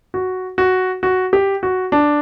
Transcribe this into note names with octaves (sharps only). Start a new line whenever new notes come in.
F#4
F#4
F#4
G4
F#4
D4